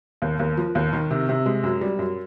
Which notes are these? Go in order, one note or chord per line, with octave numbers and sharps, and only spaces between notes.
D#2
D#2
F3
D#2
D#3
C3
C3
G#3
F#2
G3
F#2